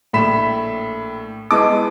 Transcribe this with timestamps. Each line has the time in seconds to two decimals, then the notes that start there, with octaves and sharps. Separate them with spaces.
0.13 A#1 A2 B5 B6 E7
1.51 G#3 B3 E4 D#5 A5 D6